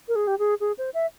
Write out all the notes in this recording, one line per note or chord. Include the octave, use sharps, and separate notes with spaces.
A#4
G#4
G4
G#4
G#4
C5
E5